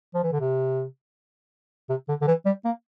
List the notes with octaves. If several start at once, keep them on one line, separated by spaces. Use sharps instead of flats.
F3
E3
D3
C3
C3
D3
D3
E3
G3
A#3